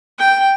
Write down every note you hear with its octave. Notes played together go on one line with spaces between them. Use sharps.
G5